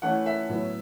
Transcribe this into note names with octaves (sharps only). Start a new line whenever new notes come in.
E3 A3 C#4 E4 F#5
E5
A2 F#3 B3